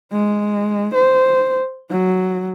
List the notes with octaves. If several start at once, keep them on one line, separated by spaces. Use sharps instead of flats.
G#3
C5
F#3